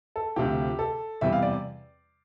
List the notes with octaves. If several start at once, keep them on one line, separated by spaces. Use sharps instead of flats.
A4
D2 C3 F3 G4
A4
E2 C3 G3 E5
F5
D5